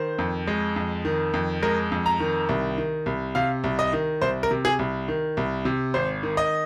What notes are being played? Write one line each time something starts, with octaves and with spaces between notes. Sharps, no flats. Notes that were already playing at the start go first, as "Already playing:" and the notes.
Already playing: D#3 C5
F2
G#3
F2
D#3
F2
G#3 A#4
F2
A#5
D#3
C2
D#3
C2
C3 F5
C2
D#5
D#3
C2 C5
A#4
C3
G#4
C2
D#3
C2
C3
G#1 C5
D#3
D#5